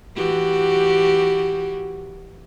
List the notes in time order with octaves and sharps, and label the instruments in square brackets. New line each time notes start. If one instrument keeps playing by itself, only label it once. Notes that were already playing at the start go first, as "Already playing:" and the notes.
[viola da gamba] E3 F#4 G4